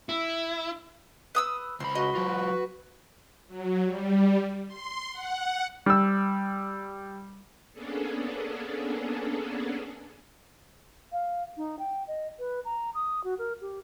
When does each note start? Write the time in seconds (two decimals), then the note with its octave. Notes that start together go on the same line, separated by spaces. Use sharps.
0.09 E4
1.35 B4 D#6 E6
1.80 C#2 C5 B5
1.95 F#4 B4 D#5
2.15 F#3 F4
3.47 F#3
3.84 G3
4.67 C6
5.11 F#5
5.86 G3 E6
7.73 A#3 B3 C#4 D4 G#4 A4
11.12 F5
11.57 D#4
11.79 G5
12.08 D#5
12.39 B4
12.65 A#5
12.95 D#6
13.24 F#4
13.39 A#4
13.61 G4